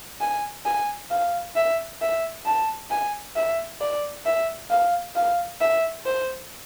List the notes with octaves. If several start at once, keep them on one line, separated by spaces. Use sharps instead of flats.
G#5
G#5
F5
E5
E5
A5
G#5
E5
D5
E5
F5
F5
E5
C5